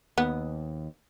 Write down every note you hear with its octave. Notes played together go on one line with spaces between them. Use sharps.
D#2 B3